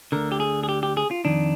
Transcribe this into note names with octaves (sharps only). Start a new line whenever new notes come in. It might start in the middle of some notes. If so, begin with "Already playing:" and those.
D2 D3 A#4
G4
G#4
G#4
G4
G4
G#4
F4
F2 D#3 D4